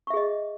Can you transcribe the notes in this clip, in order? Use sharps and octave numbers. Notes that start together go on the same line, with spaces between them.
G#4 D#5 E5 C#6